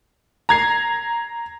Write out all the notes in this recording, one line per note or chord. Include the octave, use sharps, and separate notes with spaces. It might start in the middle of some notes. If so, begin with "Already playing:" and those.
A#5 G#6 C7